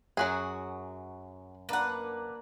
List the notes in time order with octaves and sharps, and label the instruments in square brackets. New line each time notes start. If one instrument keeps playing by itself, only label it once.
[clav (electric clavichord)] F#2 [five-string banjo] F#3 F#4 G#4
[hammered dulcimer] A#3 D4 A#4 [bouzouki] B4 F#5